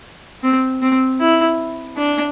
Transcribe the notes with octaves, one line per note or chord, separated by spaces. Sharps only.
C4
C4
E4
D4